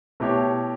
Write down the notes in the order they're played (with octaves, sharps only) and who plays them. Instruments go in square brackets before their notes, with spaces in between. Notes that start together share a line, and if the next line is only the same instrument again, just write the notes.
[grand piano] B2 A3 E4 G4 C#5